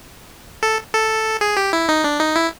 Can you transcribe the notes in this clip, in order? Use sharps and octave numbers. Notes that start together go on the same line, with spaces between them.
A4
A4
G#4
G4
E4
D#4
D4
D#4
E4